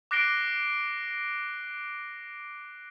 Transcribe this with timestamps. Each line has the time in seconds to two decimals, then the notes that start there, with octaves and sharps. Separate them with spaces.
0.11 D6 F#6 A#6 C7 D7 G7